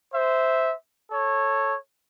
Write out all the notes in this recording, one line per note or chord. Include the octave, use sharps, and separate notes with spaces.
C5 E5
A4 C#5